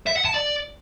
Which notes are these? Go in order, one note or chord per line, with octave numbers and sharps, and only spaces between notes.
E5
F#5
A5
D5